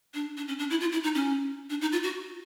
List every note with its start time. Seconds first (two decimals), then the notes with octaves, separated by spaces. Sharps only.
0.14 D4
0.37 D4
0.48 C#4
0.59 D4
0.70 E4
0.81 F4
0.92 E4
1.04 D#4
1.15 C#4
1.70 D4
1.81 D#4
1.92 F4
2.03 F#4